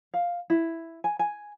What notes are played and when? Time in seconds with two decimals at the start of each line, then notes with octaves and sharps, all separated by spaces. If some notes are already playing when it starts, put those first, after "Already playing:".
0.14 F5
0.50 E4
1.04 G#5
1.19 G#5